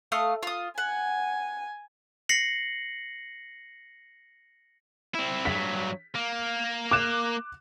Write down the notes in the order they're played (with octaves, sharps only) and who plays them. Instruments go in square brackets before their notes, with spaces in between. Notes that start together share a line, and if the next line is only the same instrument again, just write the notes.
[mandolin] A3 F5 D#6
F4 D#6
[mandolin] F#5 [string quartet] G#5
[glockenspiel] A#6 C7 C#7 F#7
[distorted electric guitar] C4 E4
[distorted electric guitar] G2 F#3 [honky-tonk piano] B6
[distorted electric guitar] A#3
[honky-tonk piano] D6 F#6 E7